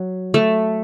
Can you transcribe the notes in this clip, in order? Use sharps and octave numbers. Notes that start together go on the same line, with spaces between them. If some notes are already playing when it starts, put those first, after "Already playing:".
Already playing: F#3
A3